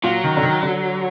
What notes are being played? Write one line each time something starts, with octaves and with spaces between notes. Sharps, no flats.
A#2 F#3
D#3
D3
D#3
D3